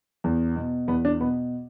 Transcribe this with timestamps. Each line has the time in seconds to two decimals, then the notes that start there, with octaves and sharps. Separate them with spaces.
0.24 E2
0.56 B2
0.88 E2 B3
1.05 D4
1.21 B2 B3